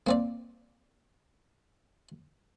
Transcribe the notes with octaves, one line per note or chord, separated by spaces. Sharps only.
A#3 C4 D5